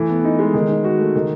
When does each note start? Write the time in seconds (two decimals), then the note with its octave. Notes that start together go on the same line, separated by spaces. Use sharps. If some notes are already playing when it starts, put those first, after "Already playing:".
Already playing: E3 A3
0.09 B3
0.24 D#4
0.39 G#3
0.54 D#3
0.69 D#4
0.84 F#4
0.99 A3
1.15 D#3